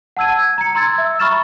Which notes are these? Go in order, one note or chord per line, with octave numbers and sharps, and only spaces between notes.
F#5 A5 E6 G#6 D#7
G#6
A#5 C#7
A#5 C6 E6 G#6 A6
E5 E6
A#5 B5 C#6 F6 A6 E7